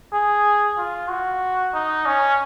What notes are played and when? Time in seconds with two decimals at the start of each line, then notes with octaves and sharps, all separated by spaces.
0.13 G#4
0.78 F4
1.10 F#4
1.74 D#4
2.06 C#4